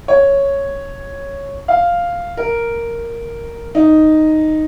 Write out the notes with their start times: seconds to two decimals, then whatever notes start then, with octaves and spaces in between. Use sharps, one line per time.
0.08 C#5
1.68 F5
2.37 A#4
3.75 D#4